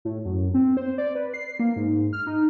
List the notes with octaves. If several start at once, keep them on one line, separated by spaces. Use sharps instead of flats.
A2
F#2
C4
C5
D5
B4
C7
A#3
G#2
F6
D#4